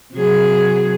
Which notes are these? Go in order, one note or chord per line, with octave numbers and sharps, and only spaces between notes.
C3 F#3 G#4